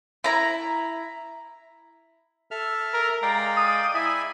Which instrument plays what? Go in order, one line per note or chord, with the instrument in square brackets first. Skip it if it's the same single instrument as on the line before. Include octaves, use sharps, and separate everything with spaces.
[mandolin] E4 A#5
[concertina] A4 E5 F6
[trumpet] A#4
[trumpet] G#3 [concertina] D5 F5 G5 [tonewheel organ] A#5
[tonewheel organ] D#6
[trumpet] E4 [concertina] E5 G#5 B5